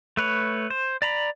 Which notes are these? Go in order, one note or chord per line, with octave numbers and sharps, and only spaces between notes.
A3 B4 C#5
C5
D5 A#5 B5